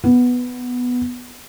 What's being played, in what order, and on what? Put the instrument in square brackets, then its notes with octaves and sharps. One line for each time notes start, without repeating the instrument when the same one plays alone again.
[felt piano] B3